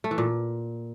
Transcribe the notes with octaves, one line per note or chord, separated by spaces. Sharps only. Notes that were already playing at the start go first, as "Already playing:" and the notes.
A3
E3
A#2